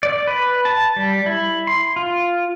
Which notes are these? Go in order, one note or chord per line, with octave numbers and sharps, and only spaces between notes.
D5
B4
A5
G3
E4
C6
F4